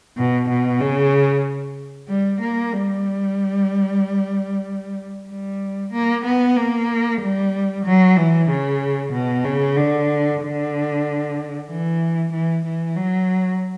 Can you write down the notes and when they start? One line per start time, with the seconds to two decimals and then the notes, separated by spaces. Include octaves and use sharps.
0.17 B2
0.49 B2
0.81 C#3
2.08 G3
2.41 A#3
2.72 G3
5.29 G3
5.92 A#3
6.25 B3
6.56 A#3
7.21 G3
7.85 F#3
8.17 E3
8.49 C#3
9.12 B2
9.44 C#3
9.76 D3
10.41 D3
11.69 E3
12.32 E3
12.65 E3
12.96 F#3